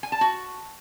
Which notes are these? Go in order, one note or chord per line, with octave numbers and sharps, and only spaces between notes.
G#5
A5
F#4